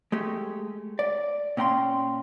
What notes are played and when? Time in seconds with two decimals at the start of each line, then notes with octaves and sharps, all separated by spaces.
0.12 G#3 A3 G4
0.99 D5
1.57 A#2 C#4 G5 A#5 C6